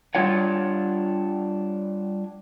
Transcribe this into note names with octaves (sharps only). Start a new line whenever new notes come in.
G3 B3 D4 F4 C#5 F#5